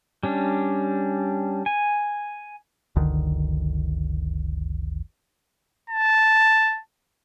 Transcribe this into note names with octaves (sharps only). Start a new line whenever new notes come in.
G3 C#4 D4
G#5
F#1 C#2 D3 D#3
A5